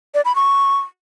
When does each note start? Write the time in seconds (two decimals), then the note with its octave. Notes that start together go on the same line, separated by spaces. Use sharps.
0.15 D5
0.25 B5
0.36 C#6